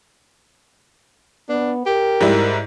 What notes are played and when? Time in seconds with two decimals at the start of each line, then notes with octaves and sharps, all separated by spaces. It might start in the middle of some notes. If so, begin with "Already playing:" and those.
1.49 B3 D4
1.86 G4 A#4
2.21 G#2 G3 E4